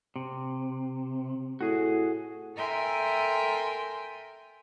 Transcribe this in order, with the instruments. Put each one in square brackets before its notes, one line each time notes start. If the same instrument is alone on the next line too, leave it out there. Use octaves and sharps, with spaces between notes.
[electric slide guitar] C3
[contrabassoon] A2 [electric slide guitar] F#4 G#4
[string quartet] A4 A#4 E5 G5 G#5 C6